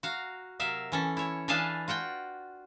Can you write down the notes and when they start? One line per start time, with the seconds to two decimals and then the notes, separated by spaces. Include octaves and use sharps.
0.03 F#4 F5 A#5
0.60 C3 F#3 A#4 E5 F5
0.92 E3 C#4 A4
1.17 E4 C#5
1.48 E3 D4 G#4 B4 F5 A5
1.88 F4 F#4 F#5 G5